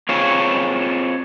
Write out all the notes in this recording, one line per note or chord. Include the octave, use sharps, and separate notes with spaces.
C4 F4 G#4 C#5